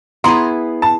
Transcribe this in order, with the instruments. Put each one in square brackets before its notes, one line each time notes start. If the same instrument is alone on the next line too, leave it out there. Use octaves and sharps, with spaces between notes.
[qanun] B3 E4 G#4 [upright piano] A#5 C6
[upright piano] A5